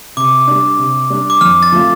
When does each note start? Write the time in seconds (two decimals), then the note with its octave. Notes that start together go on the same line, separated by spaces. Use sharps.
0.17 C3 D6
0.47 G3 D4
0.79 C3
1.10 G3 D4
1.30 D6
1.41 F2 F6
1.63 A6
1.72 F3 A3 C4 F4